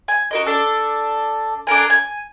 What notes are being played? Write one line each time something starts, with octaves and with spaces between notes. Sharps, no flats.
G#5
F#4 A#4 D#5
D4 A4
D4 A4 A#4 G#5
G#5